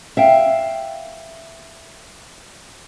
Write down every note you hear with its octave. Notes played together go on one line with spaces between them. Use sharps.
E5 F5 G5